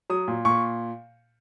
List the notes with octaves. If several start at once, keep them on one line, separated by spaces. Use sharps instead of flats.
F#3 D#6
A#2
A#2 C#6